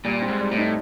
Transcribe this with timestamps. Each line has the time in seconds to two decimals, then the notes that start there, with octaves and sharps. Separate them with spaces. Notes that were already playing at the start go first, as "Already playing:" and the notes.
0.04 A#2 G3
0.22 C4
0.28 G#2
0.40 G3
0.52 A2
0.58 D#4